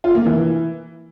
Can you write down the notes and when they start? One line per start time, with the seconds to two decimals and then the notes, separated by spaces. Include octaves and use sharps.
0.04 F4
0.15 A#3
0.26 E3